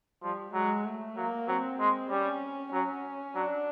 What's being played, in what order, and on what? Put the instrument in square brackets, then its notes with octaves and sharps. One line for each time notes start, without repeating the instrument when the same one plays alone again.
[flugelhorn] F3 [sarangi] G3
[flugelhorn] F#3 [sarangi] G#3
[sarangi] A3
[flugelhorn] F#3 [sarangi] A#3
[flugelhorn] F#3 [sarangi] C4
[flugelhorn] G#3
[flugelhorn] G3 [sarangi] C#4
[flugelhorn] F#3 [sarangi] C#4
[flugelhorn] F#3 [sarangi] D4